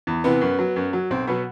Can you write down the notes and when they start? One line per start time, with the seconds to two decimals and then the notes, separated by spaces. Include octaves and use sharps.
0.07 E2
0.24 C3 E3 B3
0.41 F#2
0.59 F#3
0.76 F#2
0.93 F#3
1.10 B1 C4
1.27 B2 F#3 B3